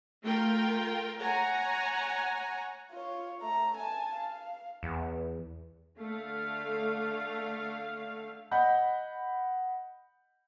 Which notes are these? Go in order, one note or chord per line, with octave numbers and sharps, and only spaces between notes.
A3 F4 A#4 G5
C#5 F#5 G#5 A#5
F4 C#5
A3 A#5
G#5 A5
F5
E2
D3 A3 F5
D#5 F#5 B5 G6